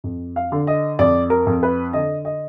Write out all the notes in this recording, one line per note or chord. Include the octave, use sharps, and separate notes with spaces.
F2
F5
D3
D#5
F2 D5
A#4
F2
B4
D3 D#5
D#5